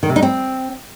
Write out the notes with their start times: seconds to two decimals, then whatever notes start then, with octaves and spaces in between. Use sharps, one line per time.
0.03 D#3
0.09 C3
0.16 D#4
0.22 C4